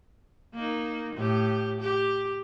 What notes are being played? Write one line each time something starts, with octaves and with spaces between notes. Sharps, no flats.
A#3 D#4
A2 G4
G4